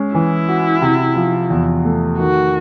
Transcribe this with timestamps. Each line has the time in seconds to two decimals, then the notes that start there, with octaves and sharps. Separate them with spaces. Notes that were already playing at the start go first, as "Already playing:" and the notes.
Already playing: G#3 C#4
0.14 E3 E4
0.48 F#4
0.82 C3
1.16 F3
1.50 E2
1.85 A3
2.19 D#3 F#4